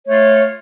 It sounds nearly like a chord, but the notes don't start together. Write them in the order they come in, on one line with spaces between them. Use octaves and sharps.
C#5 A3 F4